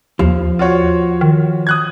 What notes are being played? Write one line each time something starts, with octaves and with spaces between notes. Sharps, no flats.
D#2 F3
F4 F#4 C#5
D#3
D#6 F#6 G#6